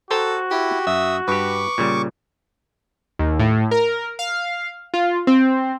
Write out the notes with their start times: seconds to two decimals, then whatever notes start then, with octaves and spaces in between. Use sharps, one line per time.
0.11 F#4 A4 C5 G5 A#5
0.51 E4 G4
0.87 F#2 E5 D#6
1.28 G2 G4 B4 C#6 D6
1.78 A#2 C#3 G3
3.19 D#2
3.39 A2
3.71 A#4
4.19 F5
4.94 F4
5.27 C4